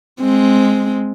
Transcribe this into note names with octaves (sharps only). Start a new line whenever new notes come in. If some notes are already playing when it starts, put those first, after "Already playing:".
G#3 C4